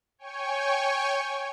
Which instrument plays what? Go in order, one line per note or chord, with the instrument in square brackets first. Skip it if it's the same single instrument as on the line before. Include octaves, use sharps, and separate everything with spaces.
[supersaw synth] C#5 G5 G#5 C#6